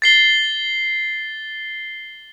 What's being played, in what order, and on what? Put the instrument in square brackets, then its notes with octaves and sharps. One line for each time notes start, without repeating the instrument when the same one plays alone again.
[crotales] A6 C7 G7